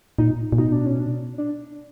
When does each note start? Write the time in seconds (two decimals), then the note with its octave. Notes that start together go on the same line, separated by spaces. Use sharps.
0.18 A#2 D#4
0.52 A#2
0.58 B2 D#4
0.72 D4
0.86 C#4
0.99 D4
1.38 D4